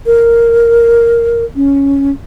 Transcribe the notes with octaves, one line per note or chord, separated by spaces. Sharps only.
A#4
C#4